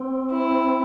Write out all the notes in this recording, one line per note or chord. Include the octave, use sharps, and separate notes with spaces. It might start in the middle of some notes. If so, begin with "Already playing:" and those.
Already playing: C4
E4